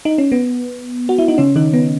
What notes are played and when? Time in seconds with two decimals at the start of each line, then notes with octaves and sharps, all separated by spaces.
0.05 D#4
0.18 C#4
0.32 B3
1.09 F#4
1.18 E4
1.28 D#4
1.38 C#3 C#4
1.56 D#3 D#4
1.73 B3